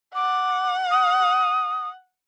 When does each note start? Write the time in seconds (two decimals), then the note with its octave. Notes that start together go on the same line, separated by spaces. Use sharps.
0.15 F#5 D6
0.91 D#6